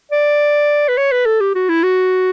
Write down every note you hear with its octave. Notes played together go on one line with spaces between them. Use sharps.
D5
B4
C#5
B4
A4
G4
F#4
E4
F#4